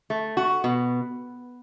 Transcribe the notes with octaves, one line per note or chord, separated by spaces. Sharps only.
A3
F#4
B2